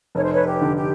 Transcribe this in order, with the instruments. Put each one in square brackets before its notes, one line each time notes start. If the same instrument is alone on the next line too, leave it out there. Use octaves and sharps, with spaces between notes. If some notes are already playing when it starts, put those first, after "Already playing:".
[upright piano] F1 [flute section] C#5
[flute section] C5
B4 C#5
G4
[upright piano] D3
[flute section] G4